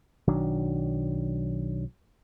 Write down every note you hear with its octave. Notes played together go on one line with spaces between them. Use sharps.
B1 D#3 F#3 D4